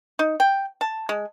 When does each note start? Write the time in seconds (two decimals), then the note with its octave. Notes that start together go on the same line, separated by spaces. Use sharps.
0.19 D#4
0.40 G5
0.81 A5
1.09 G#3